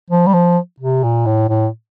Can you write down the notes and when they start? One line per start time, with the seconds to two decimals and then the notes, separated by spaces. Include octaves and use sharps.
0.11 F3
0.27 G3
0.34 F3
0.80 C3
1.03 A#2
1.26 A2
1.49 A2